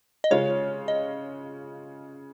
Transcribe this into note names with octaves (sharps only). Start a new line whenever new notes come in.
D#5
C#3 G#3 C#4 F4 C#5
D#5